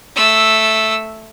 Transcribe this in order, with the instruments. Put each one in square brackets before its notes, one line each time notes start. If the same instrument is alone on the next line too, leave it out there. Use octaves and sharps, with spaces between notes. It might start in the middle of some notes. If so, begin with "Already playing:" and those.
[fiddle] A3 E6